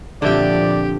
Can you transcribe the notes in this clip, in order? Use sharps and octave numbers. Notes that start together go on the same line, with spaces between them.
A#1 D3 F3 C4 G4 D5 E5 G5